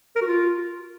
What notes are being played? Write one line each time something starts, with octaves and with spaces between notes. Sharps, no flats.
A#4
F#4
F4